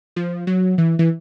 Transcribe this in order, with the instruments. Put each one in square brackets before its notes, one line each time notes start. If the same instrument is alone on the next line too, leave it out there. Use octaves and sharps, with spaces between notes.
[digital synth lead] F3
F#3
E3
E3